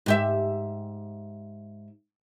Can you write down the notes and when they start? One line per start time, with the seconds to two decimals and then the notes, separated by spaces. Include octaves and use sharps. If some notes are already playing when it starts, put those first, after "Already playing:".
0.06 G#2 G4 E5